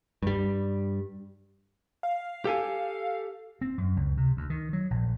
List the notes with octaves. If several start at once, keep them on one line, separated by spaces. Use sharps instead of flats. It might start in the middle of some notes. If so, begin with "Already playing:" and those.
G2 G3
F5
G4 A4 G#5
C4
F#2
C#2
C3
D2
D#3
F#3
A#1